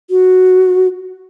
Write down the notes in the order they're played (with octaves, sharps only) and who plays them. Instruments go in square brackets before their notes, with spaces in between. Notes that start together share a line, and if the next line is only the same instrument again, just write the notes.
[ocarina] F#4